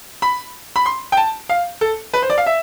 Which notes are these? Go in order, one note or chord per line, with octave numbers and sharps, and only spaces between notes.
B5
B5
C6
G5
A5
F5
A4
B4
C5
D5
F5
E5